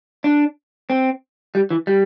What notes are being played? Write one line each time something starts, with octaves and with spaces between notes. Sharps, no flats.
D4
C4
G3
E3
G3